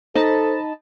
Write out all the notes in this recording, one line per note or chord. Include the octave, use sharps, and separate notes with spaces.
D#4 A4 C5 D#5 A5 B5